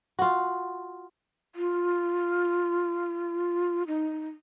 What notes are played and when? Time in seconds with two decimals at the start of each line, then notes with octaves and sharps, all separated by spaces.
0.19 F4 F#4
1.56 F4
3.87 D#4